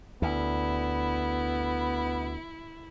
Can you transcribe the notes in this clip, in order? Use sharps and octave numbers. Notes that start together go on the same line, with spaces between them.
D2 B3 E4